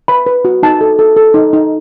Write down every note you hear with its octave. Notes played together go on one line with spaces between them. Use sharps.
B4 B5
B4
F#4
D#4 A5
A4
A4
A4
D#4
D#4